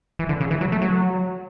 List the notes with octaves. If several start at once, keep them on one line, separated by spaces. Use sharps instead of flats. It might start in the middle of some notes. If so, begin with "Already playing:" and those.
E3
D3
C#3
E3
F#3
A3
F#3